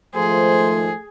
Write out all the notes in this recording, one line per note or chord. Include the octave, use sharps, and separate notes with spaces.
G#2 D#3 F3 A3 G#4 C5